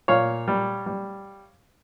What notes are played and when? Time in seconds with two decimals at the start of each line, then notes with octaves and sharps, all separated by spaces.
0.08 A#2 C#5 F5
0.48 G3
0.86 G3